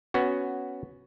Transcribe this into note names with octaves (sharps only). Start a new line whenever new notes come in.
B3 C#4 F#4